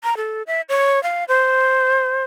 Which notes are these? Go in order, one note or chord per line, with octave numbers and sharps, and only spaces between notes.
A#5
A4
E5
C#5
F5
C5